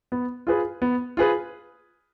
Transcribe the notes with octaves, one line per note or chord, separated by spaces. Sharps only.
B3
F4 G#4 B4
B3
F4 G#4 B4